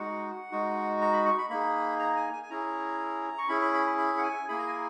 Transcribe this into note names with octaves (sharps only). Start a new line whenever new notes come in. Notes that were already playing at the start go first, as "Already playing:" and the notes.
Already playing: G#3 D#4 F#4 F#5
G#3 D#4 F#4
A#5
B5
C#6
B5
A#3 D#4 G#4 B5
A#5
G#5
G#5
G#5
C#4 E4 G#4 A#5
C#6
C#4 E4 G#4 B5
B5
B5
B5
B5
F#5
G#5
A#3 E4 G#4 B5
A#5
G#5